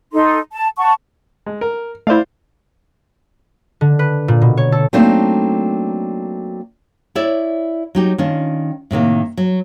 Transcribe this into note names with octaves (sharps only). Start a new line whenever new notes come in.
D#4 A4 C6
A5
F#5 A5 C#6
G#3
A#4
A3 E4 C5 D5 F5
D3
B4
A#2
B2
C#5
A4
F#3 A3 A#3 C4 D4 D#4
E4 C#5 D5 E5
F#3 D#4 G4
D#3 C#4 D4 F4
A2 C3 D#3 A#3
F#3